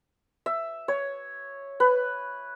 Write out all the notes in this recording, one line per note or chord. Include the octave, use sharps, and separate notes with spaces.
E5
C#5
B4